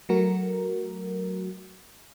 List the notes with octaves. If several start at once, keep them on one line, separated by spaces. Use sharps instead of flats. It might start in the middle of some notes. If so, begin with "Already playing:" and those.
F#3 A3 F#4 A#4